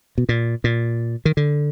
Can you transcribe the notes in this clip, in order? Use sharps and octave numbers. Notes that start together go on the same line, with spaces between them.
B2
A#2
A#2
D#3
D3